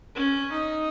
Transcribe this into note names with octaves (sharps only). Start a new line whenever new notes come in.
C#4
D#4